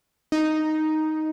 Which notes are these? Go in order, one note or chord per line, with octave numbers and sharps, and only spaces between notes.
D#4